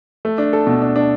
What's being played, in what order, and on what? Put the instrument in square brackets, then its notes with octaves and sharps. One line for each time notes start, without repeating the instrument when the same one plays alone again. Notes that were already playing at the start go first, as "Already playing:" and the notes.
[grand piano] A3
D4
A4
B2
D4
D4